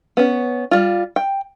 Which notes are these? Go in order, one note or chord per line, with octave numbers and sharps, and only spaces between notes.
B3 C#4
G3 F4
G5